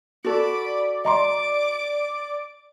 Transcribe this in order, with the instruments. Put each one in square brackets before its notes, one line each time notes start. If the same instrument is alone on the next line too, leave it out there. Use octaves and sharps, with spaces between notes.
[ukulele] F#4 A4 [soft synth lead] D5 [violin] B5 D6
[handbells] D#5 A#5 C6 [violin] D6